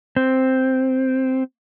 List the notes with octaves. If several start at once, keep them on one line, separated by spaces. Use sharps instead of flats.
C4